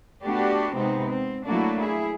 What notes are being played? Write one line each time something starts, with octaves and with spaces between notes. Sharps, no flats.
A3 B3 D4 F#4 G4
C3 G#3 B3 C4 D#4
C4
F#3 A3 A#3 D4 E4 F#4
E4 G#4